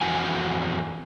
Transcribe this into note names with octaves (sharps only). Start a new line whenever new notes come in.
F2 E3 F#4 G#5